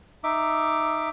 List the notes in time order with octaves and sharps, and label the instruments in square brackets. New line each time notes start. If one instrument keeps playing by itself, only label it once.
[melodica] D#4 E5 D6